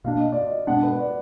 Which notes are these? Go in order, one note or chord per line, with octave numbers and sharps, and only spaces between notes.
B2 A#3 D4 F5
D#5
D5
D#5
B2 G#3 B3 D4 F#5
B4
D5